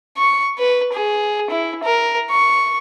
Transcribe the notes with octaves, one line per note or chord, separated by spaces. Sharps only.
C#6
B4
G#4
E4
A#4
C#6